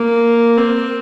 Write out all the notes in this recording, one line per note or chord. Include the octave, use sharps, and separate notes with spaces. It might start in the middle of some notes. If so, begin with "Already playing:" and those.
Already playing: A#3
C4